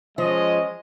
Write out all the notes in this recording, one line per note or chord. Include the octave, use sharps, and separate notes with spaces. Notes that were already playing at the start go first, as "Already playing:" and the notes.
F3 G#3 C#4 D#5